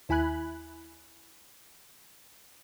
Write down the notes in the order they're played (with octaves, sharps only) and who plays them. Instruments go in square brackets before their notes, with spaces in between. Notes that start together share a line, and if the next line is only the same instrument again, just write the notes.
[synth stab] D#2 E4 G#5 B5 F#6